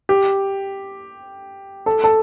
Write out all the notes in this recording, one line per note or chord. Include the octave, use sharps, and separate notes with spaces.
G4
A4
A4